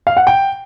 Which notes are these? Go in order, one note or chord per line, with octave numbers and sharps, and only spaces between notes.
F5
F#5
G5